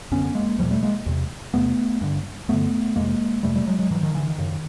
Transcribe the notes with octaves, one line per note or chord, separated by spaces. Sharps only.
F#2 D3 B3 C#4
G#3 A#3
E2 B2 F3 G3
G3 A3
G#3 A#3
E2 C3
E2 C3 A3 B3
G2 D3
G2 D3 A3 B3
F2 C3 G#3 A#3
F2 C3 G3 A3
G3 A3
F#3 G#3
F#3 G#3
G#2 E3 F#3
D#3 F3
D3 E3
D#3
F#2 C#3